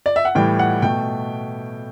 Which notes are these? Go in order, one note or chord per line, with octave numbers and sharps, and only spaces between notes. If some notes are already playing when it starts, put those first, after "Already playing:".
D5
E5
F#5
A2 E3 G3 G5
F#5
B2 A3 G5